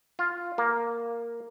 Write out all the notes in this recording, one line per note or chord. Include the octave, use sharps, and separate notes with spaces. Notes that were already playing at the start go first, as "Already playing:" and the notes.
F4
A#3